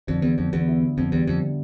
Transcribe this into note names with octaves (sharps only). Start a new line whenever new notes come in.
F2 D3
E2 B3
F2 D3
E2 B3
E4
D3
F2 B3
E2 G3
F2 D3
D3